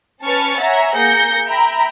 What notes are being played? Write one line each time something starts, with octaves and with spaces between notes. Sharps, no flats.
C#4 B4 A5 C#6 F6 A6
C#5 E5 F#5 G#5 A#5
A#3 G#4 G6 A#6 C#7
E5 G5 A#5 B5